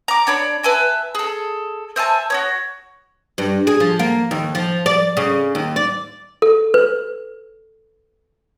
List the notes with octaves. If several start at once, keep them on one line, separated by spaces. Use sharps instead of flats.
A#5 D6
D4 C#5 D5 B5
B4 E5 G#5 A5
G#4 A4
C5 E5 G#5 A5
F#4 G4 C#5
G2
G#4
F3
A#3
D#2
F3
D5
C#3
D#2
D5
A4
B4